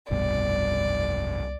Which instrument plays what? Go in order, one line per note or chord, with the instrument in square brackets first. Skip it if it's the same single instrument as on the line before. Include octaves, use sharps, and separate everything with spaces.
[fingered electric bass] F1 G2 B2 [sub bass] C2 [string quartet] D5